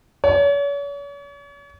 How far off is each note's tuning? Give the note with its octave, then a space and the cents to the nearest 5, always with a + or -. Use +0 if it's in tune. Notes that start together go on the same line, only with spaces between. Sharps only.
C#5 +40